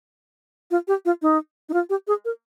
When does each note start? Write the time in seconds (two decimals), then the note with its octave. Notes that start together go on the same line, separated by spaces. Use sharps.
0.71 F4
0.88 G4
1.05 F4
1.22 D#4
1.69 D#4
1.73 F4
1.90 G4
2.08 G#4
2.25 A#4